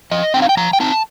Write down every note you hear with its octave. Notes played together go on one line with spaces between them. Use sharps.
F3 D#5
C4 D#4 G5
F5
G5
F3 A#5
G5
C4 D#4 A5